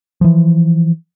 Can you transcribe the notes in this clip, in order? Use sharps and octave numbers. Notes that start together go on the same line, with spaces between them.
E3 F3